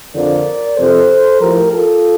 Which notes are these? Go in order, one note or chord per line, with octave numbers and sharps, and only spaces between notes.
F2 D3 F3 A#4 D5
F2 C3 F3 A4 C5
A2 F3 G4 A#4
F4 A4